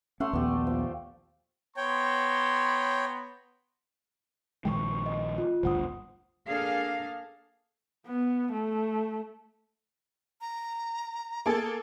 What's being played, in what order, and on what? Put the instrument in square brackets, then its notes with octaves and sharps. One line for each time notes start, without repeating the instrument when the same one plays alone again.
[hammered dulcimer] A3 F#5 C6 [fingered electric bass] C#4
[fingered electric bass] A#1 D#2 B3 [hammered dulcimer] G4 D5
[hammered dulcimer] F3
[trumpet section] B3 A#5 C6 [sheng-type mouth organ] C#5 G5
[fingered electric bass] A#1 D#3 G#3 [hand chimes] G5 C#6
[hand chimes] D#5
F4
[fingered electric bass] G#1 D2 G2 [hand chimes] C5 F#5 D#6
[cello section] A#3 D4 G#4 A4 F5
[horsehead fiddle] B3
A3
[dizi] A#5
[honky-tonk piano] A#3 G#4 A4 [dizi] A5